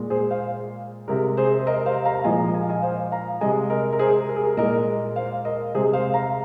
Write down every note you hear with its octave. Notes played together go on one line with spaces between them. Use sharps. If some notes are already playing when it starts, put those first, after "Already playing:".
Already playing: A#2 G#3
G#4 C5
C5 F5
C3 G#3 A#4
G#4 C5
C5
A#4 D#5
C5 F5
F5 A#5
A#5
A#2 F3 G#3 D#5 G#5
G#5
F5
D#5 G#5
C5 F5
F5 A#5
C3 G#3 D#5 G#5
A#4 D#5
A#4
G#4 C5
A#4
G#4
A#4
A#2 G#3 A#4 D#5
C5 F5
A#4 D#5
C3 G#3 G#4 C5
C5 F5
F5 A#5